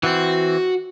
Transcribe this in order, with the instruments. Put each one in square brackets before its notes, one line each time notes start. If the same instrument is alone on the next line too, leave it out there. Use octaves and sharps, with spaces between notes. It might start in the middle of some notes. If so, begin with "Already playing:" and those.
[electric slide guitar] E3 C4 [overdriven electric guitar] F#4